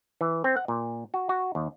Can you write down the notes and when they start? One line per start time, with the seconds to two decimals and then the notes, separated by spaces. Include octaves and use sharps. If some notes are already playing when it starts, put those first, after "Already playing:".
0.21 E3
0.44 C4
0.56 F#5
0.68 A#2
1.14 F#4
1.29 F#4
1.55 D#2